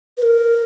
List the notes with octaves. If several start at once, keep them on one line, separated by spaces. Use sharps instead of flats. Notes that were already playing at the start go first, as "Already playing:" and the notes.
B4
A#4